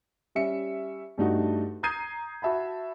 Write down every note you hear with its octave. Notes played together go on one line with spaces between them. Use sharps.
G3 C#4 E5 C#7
G2 G3 A3 D#4 F#4
A#5 D#6 G6 G#6 C7 D#7
F#4 E5 A5 B5